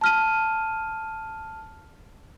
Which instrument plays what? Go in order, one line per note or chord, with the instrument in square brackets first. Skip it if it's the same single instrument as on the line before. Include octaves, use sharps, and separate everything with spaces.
[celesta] A5 F6 D#7